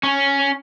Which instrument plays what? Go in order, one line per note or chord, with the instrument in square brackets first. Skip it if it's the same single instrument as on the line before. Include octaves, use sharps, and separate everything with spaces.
[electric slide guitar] C#4